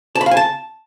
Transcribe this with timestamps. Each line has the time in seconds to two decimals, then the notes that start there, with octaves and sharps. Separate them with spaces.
0.15 A5
0.21 B5
0.26 F5
0.31 G#5
0.37 A5